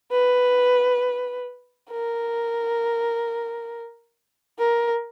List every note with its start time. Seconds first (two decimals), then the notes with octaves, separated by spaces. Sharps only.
0.11 B4
1.91 A#4
4.59 A#4